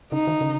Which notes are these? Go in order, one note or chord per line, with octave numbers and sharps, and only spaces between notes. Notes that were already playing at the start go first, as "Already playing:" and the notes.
C#3 D#4
D#3
C#3